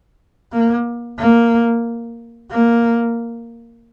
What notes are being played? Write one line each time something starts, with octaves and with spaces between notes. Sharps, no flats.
A#3
A#3
A#3